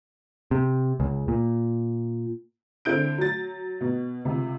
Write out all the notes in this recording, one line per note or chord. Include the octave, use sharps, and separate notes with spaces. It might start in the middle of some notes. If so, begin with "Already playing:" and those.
C3
C#2
A#2
D3 C4 E4 G6 D7
F#3 A6
B2
C#2 C3